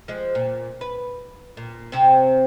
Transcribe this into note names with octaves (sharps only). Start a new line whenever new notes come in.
F3 G#3
A#2
B4
A#2
C3 C4